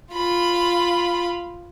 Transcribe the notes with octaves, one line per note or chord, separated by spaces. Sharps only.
F4 B5